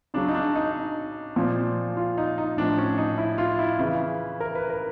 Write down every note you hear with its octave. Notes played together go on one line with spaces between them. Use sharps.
C#3 F#3 D4
D#4
D4
D#4
A#2 F3
F4
D#4
D#4
A2 F3 D4
C#4
D#4
E4
F4
E4
C#3 E3
A#4
B4
A#4